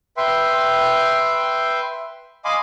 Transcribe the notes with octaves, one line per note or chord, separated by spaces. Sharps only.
B4 E5 G5 C6
D#5 F5 G#5 B5 C6 D6